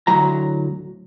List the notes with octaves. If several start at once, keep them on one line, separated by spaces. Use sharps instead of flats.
D2 A2 F#3 A#5